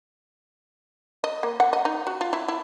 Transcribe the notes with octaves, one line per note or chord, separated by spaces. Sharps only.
D#5
A#3
F#5
D#5
D#4
F#4
F4
E4
E4